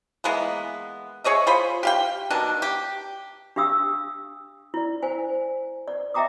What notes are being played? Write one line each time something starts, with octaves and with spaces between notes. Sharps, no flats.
E3 G#3 A#3 B3
G#4 C#5 D#5 E5
F4 G#4 C5 B5
G4 F5 G5
B2 D#3 D4
G4
D4 G4 F5 D#6 E6
E4 D5
C5 G#5
D5
D#5 E5 G5 A#5 D6 D#6